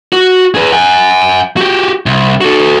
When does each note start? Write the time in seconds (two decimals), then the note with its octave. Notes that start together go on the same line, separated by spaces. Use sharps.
0.13 F#4
0.55 G#4 B4
0.72 F#5 G#5
1.57 F#4 G4
2.06 C2
2.41 F#4 A4